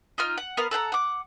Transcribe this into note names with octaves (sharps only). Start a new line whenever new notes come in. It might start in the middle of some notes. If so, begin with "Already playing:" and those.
D#4 F4 F6
F#5
B3 A#4 F5 F#5
A4 F#5 G5 A#5
F#5 D6